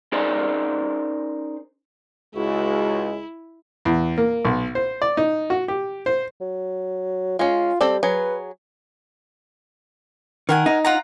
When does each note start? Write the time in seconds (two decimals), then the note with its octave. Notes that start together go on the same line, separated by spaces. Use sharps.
0.12 C#4 D#4 G#4 A#4 C5 D5
2.35 C#2 G#3 E4 F#4
3.85 E2
4.18 A#3
4.45 B1
4.75 C5
5.02 D5
5.17 D#4
5.50 F#4
5.68 G4
6.06 C5
6.41 F#3
7.39 G#3 C#4 F4
7.81 G3 C4 A4 D5
8.03 F#3 G#4 B4
10.49 D#3 A#4 F#5 G#5
10.66 D#4
10.85 F4 F#5 A#5